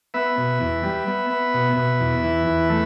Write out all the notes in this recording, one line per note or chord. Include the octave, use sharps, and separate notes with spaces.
B3 B4 E5
B2
E2
G3
B3
B3
B2
B2
E2
E3
E2
A3